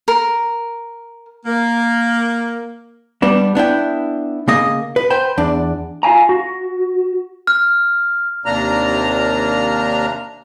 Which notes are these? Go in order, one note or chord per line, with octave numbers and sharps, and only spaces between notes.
A#4
A#3
G3 B3 D4
B3 D4 E4 G5
C#3 A#3 D#5
B4
B4 C5 G5
E2 D4 D5
F4 F5 G#5 A#5
F#4
F6
D#2 C3 A#3 D4 A#5 F6